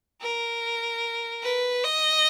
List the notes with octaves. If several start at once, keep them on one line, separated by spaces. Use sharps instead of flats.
A#4
B4
D#5